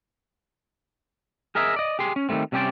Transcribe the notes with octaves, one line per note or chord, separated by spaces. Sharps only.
G#4 A#4 D#5 E5 G#5 A#5
D5 D#5
G4 G#4 C6
C#4
D#3 F#3 G3 A3 C4
C3 G3 C#4 G4 C5 D5